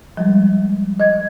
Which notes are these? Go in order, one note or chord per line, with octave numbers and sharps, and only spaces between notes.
F3 G3 G#3
D#5 G#6